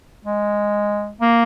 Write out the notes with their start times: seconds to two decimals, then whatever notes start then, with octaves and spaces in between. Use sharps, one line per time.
0.25 G#3
1.21 A#3